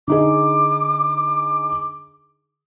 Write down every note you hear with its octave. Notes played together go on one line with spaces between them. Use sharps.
D3 D#4 G#4 D6